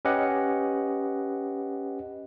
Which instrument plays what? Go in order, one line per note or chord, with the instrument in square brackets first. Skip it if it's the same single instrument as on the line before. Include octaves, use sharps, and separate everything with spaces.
[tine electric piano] C#4 G4 B4 D#5 F#5